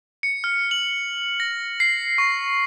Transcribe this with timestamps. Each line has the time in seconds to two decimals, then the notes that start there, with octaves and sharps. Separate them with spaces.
0.23 C#7
0.44 F6
0.71 F#7
1.40 A#6
1.80 C7
2.18 C#6